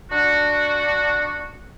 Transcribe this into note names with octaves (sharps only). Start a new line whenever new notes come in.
D4 F#4